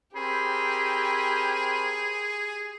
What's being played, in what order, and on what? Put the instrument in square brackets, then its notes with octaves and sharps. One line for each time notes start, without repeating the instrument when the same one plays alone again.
[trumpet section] C4 A#4 B5 [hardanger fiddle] G4 [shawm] G#4